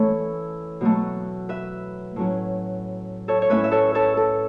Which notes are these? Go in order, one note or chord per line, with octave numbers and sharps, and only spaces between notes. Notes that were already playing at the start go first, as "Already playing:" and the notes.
Already playing: E3 A3 C#4 E4 A4 C#5
B2 F#3 A3
B4 E5
A2 F#3 C#4
A4 C#5
C#5
A2 A3 C#4 E4 B4 E5
E5
A4 C#5
A4 C#5
A4